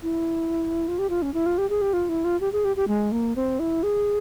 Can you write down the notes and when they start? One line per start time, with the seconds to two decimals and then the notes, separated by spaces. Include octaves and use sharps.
0.03 E4
0.88 F4
0.99 G4
1.10 F4
1.22 C#4
1.34 E4
1.46 F4
1.58 G4
1.70 G#4
1.81 G4
1.93 F4
2.09 E4
2.24 F4
2.41 G4
2.52 G#4
2.65 G4
2.76 G4
2.88 G#3
3.12 A#3
3.36 C4
3.59 E4
3.83 G#4